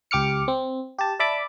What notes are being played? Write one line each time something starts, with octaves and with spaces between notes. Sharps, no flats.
C#2 G4 D6 F6 C#7
C4
G4 A5
D5 E5 A5 B5 D6